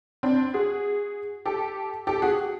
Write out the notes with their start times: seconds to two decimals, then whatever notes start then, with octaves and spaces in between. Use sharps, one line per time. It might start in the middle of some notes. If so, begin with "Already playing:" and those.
0.23 C4 D4
0.54 F#4 G#4
1.46 G4 A4
2.07 G4 A4
2.22 F#4 G#4